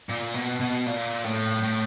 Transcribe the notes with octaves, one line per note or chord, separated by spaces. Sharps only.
A#2
B2
B2
A#2
A2
A2